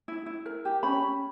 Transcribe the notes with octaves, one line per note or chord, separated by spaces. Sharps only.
E4
E4
A#4
G4
C#4 B5
C#4